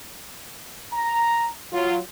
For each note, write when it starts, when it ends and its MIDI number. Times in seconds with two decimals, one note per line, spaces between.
0.93 1.49 82
1.73 1.98 54
1.73 1.98 65